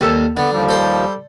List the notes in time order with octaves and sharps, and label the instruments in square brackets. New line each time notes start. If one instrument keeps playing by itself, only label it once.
[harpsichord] D#2 [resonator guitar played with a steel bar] G3 A4 A5
[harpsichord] D3 [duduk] B3 [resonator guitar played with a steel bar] D5
[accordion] D#2 F3 [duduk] G3
[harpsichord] A4 C5